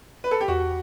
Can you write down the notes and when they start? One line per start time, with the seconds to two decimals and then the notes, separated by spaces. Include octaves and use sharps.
0.24 B4
0.31 A4
0.41 G4
0.48 E2 F#4